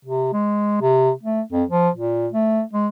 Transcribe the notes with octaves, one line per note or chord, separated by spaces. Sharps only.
C3
G#3
C3
A3
F2
F3
A#2
A3
G#3